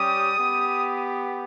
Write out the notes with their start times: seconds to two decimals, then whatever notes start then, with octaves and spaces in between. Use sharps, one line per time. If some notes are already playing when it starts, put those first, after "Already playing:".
Already playing: G3 C#4 G4 D#6
0.36 B3 G4